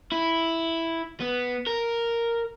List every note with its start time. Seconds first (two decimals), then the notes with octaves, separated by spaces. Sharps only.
0.12 E4
1.20 B3
1.66 A#4